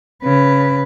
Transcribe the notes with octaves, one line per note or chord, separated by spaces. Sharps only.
C#3 B4